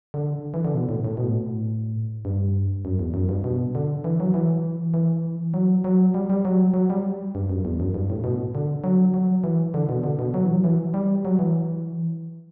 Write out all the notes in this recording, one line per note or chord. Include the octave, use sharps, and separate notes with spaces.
D3
E3
D3
B2
A2
A2
B2
A2
G2
F#2
E2
F#2
G2
B2
D3
E3
F#3
E3
E3
F#3
F#3
G3
G3
F#3
F#3
G3
G2
F#2
E2
F#2
G2
A2
B2
D3
F#3
F#3
E3
D3
B2
D3
B2
F#3
E3
F#3
E3
G3
F#3
E3